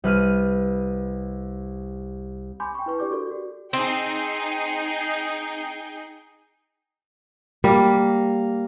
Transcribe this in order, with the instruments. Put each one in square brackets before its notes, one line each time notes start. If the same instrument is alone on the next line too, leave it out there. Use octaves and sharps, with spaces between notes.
[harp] C2 B4 F6 D#7
[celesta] G#5 B5 C6 D6 G6
G5 C#6
E4 B4 C#6
D4 G4 D5 D6 G6
F#4 A4 A#4 D5
F#4 G4
[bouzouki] C4 [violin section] D#4 G#4 G5
[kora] G3 [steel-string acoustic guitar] A#3